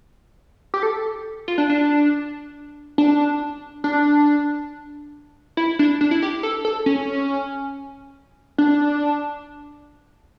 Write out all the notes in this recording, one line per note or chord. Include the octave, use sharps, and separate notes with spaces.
G4
A4
F4
D4
D4
D4
D4
E4
D4
D4
E4
G4
A4
A4
C#4
D4